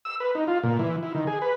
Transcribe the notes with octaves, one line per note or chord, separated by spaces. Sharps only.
E6
B4
D#4
F4
A#2
E3
E4
D#3
G#4
B4